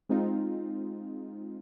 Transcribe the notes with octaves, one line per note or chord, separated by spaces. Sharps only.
G#3 C4 D#4 F4